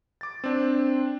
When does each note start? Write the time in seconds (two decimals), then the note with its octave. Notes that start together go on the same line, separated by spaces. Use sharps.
0.21 D6 A6
0.44 C4 D4